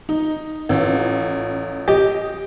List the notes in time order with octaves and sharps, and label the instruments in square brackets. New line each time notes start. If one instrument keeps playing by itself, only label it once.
[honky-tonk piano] D#4
A1 F4
[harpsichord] G4 [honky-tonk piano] D#5